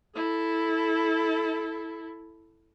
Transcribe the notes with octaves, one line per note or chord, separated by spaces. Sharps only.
E4 A4